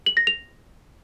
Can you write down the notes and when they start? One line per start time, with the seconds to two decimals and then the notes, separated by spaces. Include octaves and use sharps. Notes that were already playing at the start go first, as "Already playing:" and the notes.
0.06 F#7
0.17 A#6
0.27 F7